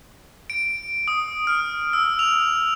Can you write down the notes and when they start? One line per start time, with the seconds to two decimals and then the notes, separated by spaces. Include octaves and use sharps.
0.50 D7
1.08 D#6
1.47 F6
1.93 E6
2.19 F7